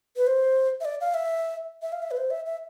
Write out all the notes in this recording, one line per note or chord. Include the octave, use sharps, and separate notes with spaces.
B4
C5
E5
D5
F5
E5
E5
F5
E5
B4
C5
E5
E5